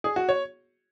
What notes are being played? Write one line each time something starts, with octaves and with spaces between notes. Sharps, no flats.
G#4
F#4
C#5